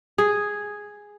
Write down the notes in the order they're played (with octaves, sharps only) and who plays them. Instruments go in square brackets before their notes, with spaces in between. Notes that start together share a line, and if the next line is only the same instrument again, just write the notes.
[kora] G#4